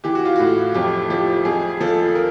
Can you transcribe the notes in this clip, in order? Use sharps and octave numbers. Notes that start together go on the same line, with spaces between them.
E3 G4
F#4
F4
A2 F#4
F2 G4
F3 G4
F2 G#4
F3 A4
A#4